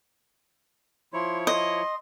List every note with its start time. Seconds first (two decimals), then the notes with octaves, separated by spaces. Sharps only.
1.13 F3 E4 C#5 C6
1.47 D#5 C6